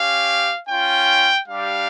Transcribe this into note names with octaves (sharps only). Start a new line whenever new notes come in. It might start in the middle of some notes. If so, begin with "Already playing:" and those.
Already playing: C#4 G4 F5
C#4 F4 G5
G3 D4 G4 F5